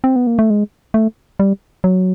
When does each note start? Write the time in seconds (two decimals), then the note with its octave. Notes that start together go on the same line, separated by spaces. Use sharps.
0.04 C4
0.16 B3
0.27 A#3
0.39 A3
0.50 G#3
0.94 A3
1.40 G3
1.84 F#3